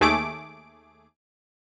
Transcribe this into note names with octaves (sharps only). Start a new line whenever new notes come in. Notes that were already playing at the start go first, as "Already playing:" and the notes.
D#2 A3 G#4 D6 D7